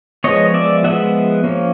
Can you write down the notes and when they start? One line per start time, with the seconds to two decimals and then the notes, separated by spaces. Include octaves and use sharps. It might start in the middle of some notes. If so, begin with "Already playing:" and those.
0.24 F3 G#3 B3 C#5 D#5
0.54 D5 E5
0.84 F3 G#3 B3 E5 F#5
1.44 F3 A#3 C#4